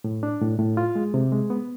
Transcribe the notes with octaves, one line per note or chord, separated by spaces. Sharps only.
A2
D4
A2
A2
F4
G#3
C3
G#3
B3